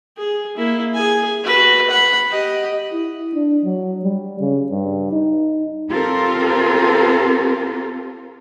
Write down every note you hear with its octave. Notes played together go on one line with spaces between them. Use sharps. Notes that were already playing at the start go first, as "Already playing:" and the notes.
G#4
A#3 E4
G#4 G#5
F#4 B4
F#5 B5
G4 D#5
E4
D4
F#3
G3
C#3
G2
D#4
C4 F4 G4 A4 A#4